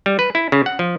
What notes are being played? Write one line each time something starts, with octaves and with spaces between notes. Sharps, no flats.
G3
B4
E4
C#3
F#5
F3